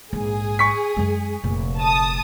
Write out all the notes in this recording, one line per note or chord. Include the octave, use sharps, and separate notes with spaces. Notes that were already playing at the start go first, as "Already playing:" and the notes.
A#1 G#2 G#4
C#6 B6
F#2 G#3
F1 A#2
A5 D#6